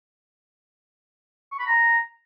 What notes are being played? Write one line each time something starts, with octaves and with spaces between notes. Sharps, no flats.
C#6
B5
A#5